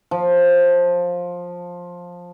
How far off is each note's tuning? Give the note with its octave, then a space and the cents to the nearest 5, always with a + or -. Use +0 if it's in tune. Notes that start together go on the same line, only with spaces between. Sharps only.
F3 +15